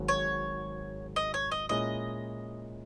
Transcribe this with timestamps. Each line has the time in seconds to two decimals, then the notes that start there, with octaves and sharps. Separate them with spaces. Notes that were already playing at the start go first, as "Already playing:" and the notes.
Already playing: G#1 G#2 F#3
0.08 C#5
1.16 D#5
1.34 C#5
1.51 D#5
1.69 A#2 G#3 C#4 E4 D#5